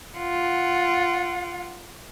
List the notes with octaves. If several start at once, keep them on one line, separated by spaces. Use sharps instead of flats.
F4 F#5